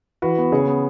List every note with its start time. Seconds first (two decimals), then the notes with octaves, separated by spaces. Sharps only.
0.22 E3 F#4 B4
0.38 B3
0.52 C#3 G#4 C#5
0.67 B3